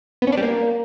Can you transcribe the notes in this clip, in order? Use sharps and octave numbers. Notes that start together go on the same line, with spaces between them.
B3
C#4
D4
G3
A#3